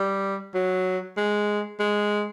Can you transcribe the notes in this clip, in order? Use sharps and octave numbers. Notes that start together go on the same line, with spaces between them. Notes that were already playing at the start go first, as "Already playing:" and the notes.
Already playing: G3
F#3
G#3
G#3